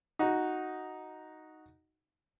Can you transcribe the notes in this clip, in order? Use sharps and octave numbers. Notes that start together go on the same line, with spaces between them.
D#4 F#4